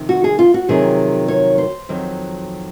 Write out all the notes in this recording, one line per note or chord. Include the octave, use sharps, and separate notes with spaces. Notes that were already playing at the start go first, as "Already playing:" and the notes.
Already playing: F2 C3 D#3
F#4
G#4
F4
F#4
F2 C3 D#3 F#3 G#4
C#5
C5
F2 D#3 F#3